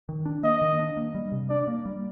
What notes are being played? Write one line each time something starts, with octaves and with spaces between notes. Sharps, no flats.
D#3
D4
A#3 D#5
D#3
D4
A#3
G3
C3
D4 D5
A#3
G3